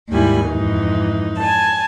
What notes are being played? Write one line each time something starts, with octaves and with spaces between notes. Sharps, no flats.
D#2 G#2 G3 E4 G#5
F2 G#2 E3 D#4
G#5 A5